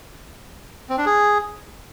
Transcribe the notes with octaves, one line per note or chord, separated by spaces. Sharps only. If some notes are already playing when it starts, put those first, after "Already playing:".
C4
D4
G#4